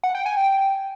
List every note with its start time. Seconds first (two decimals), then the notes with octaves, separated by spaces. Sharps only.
0.03 F#5
0.15 G5
0.26 G#5
0.37 G5